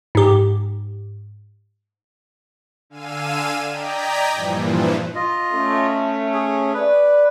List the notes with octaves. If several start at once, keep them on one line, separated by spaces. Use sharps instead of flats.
G#2 G4
D3 F5 G#5 E6 D#7
D5 D#5 G5 A#5 G#6 B6
G2 A#2 E3 F3
F4 D#5
A3 C#4
G#4
B4 D5